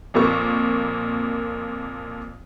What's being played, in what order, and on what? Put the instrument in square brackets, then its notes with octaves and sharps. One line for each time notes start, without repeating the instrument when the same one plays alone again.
[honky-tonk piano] F2 A#2 A#3 C#6